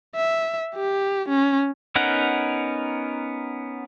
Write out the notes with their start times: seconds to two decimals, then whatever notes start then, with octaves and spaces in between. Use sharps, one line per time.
0.16 E5
0.75 G4
1.29 C#4
1.96 B3 C#4 D#4 A#4 F#5